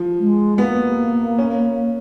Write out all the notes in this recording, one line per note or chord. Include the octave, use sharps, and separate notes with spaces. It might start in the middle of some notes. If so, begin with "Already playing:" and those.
Already playing: F3
G#3
A#3 B3
C#4